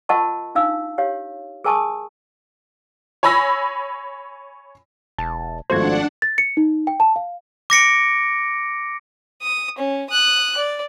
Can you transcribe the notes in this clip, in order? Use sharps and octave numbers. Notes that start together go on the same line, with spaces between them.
F4 A#4 D#5 F#5 A5 C#6
D4 D#4 F5 E6
G4 C#5 F5
G#4 A#4 G#5 A5 C#6 D#6
C#5 G#5 B5 E6 A#6
E1 A5
G#1 F3 A3 D4 F#4 C5 F#5 G#6
A6
C#7
D#4
G5
A5
F5
D6 A#6 C#7 D7
D#6
C#4
D#6 F#6
D5